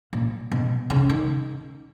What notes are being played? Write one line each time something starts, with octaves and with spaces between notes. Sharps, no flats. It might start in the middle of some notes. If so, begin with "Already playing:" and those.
A#2
B2
C#3
D#3